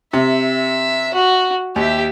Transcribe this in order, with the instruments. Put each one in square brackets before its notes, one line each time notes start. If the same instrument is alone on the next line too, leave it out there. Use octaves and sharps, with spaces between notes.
[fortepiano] C3 [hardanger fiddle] E5
[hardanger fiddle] F#4
[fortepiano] D#2 [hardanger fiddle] G4 E5